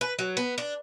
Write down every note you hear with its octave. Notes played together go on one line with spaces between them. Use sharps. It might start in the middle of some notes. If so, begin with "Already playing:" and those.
B4
F#3
B3
D4